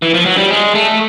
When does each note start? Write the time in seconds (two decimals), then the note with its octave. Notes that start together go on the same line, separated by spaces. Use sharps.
0.02 E3
0.14 F3
0.26 F#3
0.37 G3
0.51 G#3
0.75 A3